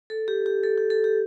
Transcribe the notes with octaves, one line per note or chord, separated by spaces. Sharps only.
A4
G4
G4
A4
G4
A4
G4